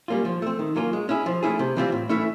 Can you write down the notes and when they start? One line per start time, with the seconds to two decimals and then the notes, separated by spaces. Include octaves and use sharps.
0.08 G3 A#3 C#4 F4
0.25 F3
0.42 A3 C4
0.59 D#3
0.76 F#3 A#3 C#4 F4
0.93 G#3
1.09 C#4 E4 G#4
1.26 F3
1.43 A3 C#4 E4 G#4
1.59 C3
1.76 E3 G3 C4 F4
1.92 A2
2.09 E3 A3 C#4 E4